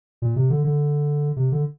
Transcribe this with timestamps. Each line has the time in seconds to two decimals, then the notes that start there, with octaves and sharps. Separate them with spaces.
0.22 A#2
0.36 C3
0.50 D3
0.64 D3
1.36 C3
1.52 D3